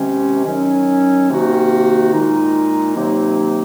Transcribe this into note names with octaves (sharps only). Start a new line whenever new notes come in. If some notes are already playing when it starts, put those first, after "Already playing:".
Already playing: C3 D#3 G#3 C#4
D#3 F#3 C#4
C3 D#3 A#3 D#4 F#4
A#2 G#3 D#4
C3 D#3 F#3 A#3 D#4